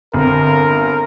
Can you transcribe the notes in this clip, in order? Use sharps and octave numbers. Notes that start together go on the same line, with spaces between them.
G1 C4 A#4